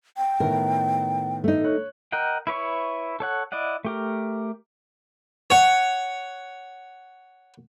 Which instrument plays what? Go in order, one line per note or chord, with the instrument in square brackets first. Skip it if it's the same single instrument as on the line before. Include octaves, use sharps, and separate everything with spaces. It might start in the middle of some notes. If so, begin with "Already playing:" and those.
[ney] G5
[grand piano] A2 D#3 B3 [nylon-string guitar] A#4
[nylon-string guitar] A3 D#4
[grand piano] C#5 F#6
[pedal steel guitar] A#4 D#5 F#5 G5
E4 B4 C#5 C#6
A4 C#5 F#5
E4 D5 D#5 F#5
A3 G4 A#4
[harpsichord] C#5 F#5